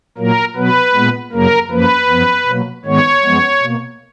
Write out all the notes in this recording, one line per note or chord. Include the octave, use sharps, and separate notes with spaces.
A#2 F#3 A#3 A#4
B2 F#3 B3 B4
A#2 G#3 B3
F#2 C#3 F#3 A#3 A#4
F#2 F3 A#3 B4
F#2 F3 B3
B2 F#3 A#3
G#2 D#3 G#3 B3 C#5
F#2 F3 G#3 B3
B2 A#3